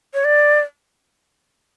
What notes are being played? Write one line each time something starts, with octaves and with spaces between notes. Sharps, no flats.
C#5
D5